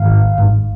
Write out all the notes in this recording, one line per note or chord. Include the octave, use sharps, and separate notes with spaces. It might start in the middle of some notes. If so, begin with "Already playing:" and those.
Already playing: G#2 D#3 F5
G#1
G#2